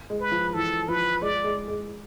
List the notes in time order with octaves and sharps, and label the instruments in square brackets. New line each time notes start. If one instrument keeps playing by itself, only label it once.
[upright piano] G#3
[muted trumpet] B4
[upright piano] F3
[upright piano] E3 [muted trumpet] A4
[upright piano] F3 [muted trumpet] B4
[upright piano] G#3 [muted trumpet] D5
[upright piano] G#3
G#3